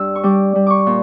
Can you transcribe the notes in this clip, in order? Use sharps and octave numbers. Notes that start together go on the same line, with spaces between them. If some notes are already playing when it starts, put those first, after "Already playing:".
Already playing: G2 E6
C#6
G3 D6
G3
C#6 D6
A#2